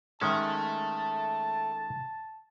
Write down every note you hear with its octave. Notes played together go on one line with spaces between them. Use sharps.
D#3 G#3 C#4 A4 E5 A5